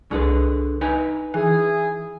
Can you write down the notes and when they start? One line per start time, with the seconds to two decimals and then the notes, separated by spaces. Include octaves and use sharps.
0.11 C2 D3 G#4 B4
0.81 D#4 B4 G#5
1.34 E3 E4 G#4